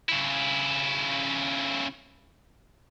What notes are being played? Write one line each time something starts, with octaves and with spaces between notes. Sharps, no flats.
C#3 E4